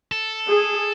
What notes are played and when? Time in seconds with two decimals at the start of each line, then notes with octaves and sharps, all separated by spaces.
0.12 A4
0.49 G#4